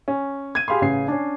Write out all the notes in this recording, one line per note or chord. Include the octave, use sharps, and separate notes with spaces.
C#4
G#6 D#7
G4 G#4 F5 B5 C6
A1 C#3 C7
C#4 D4